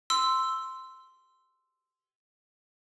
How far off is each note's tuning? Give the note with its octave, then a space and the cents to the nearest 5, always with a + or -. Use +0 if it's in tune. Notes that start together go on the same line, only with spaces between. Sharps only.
C6 -5 E6 +0